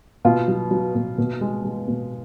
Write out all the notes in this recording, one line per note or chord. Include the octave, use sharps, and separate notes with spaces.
B2 F4
F#3
F#3
B2
B2
G#3
G#3
B2